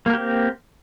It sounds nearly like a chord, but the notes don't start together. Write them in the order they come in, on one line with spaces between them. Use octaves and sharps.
A#3 A#4 G4 C4